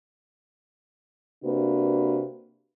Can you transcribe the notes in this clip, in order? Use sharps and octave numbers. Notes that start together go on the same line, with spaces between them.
C3 A#3 D4 F#4 B4